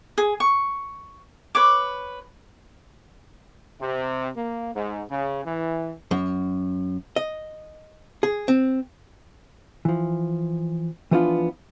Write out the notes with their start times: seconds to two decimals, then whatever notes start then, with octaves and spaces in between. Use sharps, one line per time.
0.18 G#4
0.40 C#6
1.55 B4 C#5 D6
3.81 C3
4.36 A#3
4.75 G#2
5.10 C#3
5.45 E3
6.11 F#2
7.16 D#5
8.23 G#4
8.48 C4
9.85 E3 F3
11.11 E3 F3 B3 D4 D#4 F4